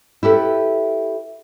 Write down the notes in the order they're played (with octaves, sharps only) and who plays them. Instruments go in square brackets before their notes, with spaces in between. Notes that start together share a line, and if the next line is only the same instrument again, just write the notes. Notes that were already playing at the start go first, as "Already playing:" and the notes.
[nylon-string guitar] E4 G4 A4 B4